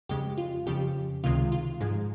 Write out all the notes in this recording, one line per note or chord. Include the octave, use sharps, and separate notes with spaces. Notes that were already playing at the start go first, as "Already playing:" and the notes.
F2 C#3 G#3 G4
F4
F2 C#3 F3 G4
C#2 C3 D#3 G#3 F4
F4
G#2 F3 G#3